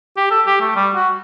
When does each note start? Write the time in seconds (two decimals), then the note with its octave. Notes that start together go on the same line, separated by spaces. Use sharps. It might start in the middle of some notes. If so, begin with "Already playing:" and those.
0.17 G4
0.31 A4
0.46 G4
0.61 A3
0.76 G3
0.95 F#4